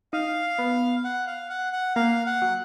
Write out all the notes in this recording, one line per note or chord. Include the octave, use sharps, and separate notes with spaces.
D#4 F5
B3
F#5
F5
F#5
F#5
A#3 F5
F#5
F#3